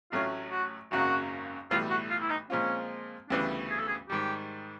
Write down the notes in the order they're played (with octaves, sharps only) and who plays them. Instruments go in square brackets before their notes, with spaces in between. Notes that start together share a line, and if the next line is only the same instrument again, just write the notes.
[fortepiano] A1 A2 F#3 A3 C#4 [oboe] F4
[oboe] F#4
[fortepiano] G#1 F#2 C#3 F#3 A#3 [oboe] F#4
[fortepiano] B1 A2 E3 G3 [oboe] F4
[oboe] F#4
F4
E4
D#4
[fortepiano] A#2 F3 G#3 C4 F4 [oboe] C#4
[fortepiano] D2 C#3 E3 G3 B3 [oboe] D4
[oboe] G#4
A4
G#4
[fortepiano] G#2 D#3 G3 [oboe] G4